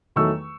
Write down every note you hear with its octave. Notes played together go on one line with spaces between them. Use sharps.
E2 D#3 F#3 A3 C#6 E6